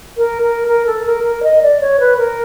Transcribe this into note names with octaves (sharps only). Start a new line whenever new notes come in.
A#4
A#4
A#4
A4
A#4
A#4
D#5
D5
C#5
B4
A#4